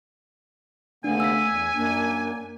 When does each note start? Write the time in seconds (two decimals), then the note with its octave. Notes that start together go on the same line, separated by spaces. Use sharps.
1.04 D#2 C#3 A3 B3 D4 G#5
1.20 E6 B6
1.49 E2
1.75 F#2 A#3 D4